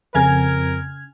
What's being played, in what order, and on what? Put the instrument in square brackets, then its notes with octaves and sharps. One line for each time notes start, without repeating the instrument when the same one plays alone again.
[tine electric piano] F2 [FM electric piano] C#3 F6 G#6 [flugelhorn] A#4 [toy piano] E5 G#5